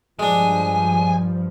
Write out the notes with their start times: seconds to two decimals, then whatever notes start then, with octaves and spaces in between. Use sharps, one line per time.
0.19 G2 F3 G#3 D4 G#5